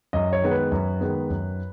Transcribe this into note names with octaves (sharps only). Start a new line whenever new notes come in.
F#2 D#5
C#5
D#3 G#3 B3
B4
F#2
D#3 G#3 B3
F#2